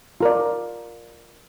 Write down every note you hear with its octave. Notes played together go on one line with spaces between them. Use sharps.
F4 A#4 D5